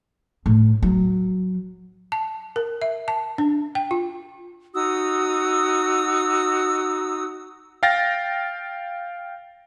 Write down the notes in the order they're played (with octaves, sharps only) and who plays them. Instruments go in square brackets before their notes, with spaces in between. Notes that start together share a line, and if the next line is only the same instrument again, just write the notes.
[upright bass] A2
F#3
[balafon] A5
A#4
E5
A5
D4
G5
F4
[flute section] D#4 F#4 D#6 E6
[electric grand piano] F5 G5 A6 A#6